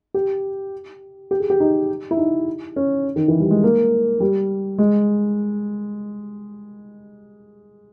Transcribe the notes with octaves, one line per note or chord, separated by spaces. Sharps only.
G4
G4
G#4
G4
D#4
E4
D#4
C#4
D#3
E3
G3
G#3
A#3
G3
G#3